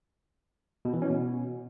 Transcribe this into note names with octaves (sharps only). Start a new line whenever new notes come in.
B2
E3
C#4
B2